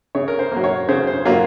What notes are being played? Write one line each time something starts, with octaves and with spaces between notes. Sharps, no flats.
C#3 C#5
A#4
C5
F#3 A#3
C#5
C#3 C5
C5
F#3 A#3 F4